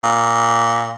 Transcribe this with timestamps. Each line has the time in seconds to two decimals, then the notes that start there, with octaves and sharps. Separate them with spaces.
0.03 A#2